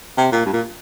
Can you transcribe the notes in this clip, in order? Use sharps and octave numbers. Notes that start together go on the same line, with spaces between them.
C3
A#2
G2
A#2